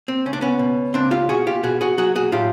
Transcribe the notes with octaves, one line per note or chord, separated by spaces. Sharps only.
C4
C#2 C#4
D4
B3 C#4
B2
C#2 C4 D4
F4 G4
B2 F#4 G#4
F4 G4
B2 F#4 G#4
F#4 G#4
F#3 F#4 G#4
F#4 G#4
A2 F4 G4